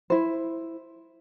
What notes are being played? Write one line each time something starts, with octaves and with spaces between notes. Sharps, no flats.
E4 C5